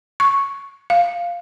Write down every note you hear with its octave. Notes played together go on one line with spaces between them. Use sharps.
C#6
F5